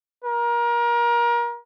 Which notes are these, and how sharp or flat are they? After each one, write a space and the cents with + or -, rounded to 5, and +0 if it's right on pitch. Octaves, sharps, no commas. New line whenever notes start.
A#4 +30